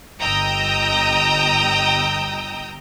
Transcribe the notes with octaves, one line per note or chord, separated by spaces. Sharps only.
G1 D#5 G5 A#5 D#6 E6